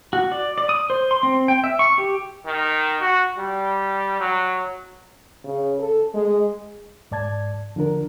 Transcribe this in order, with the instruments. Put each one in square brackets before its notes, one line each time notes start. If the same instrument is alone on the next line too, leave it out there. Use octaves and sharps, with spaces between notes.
[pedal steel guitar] F#4
D5
D5
D#6
C5
C6
C4
G5
E5
C#6
G4
[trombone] D#3
F#4
G3
F#3
[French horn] C#3
A4
G#3
[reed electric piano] G#2 D5 A5 G#6
D3 F3 D4 A#4